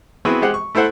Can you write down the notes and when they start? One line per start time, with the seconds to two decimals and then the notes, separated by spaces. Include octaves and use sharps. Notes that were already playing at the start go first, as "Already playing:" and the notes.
0.25 B3 C4 E4 F#4 G#4 G5
0.42 G#3 G4 C5 F#5
0.54 C#6
0.75 A3 E4 A4 C5 F#5